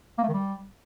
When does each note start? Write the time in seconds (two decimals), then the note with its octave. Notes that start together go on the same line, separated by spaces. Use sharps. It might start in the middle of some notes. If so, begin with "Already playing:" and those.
0.18 A#3
0.23 A3
0.28 D#3
0.33 G3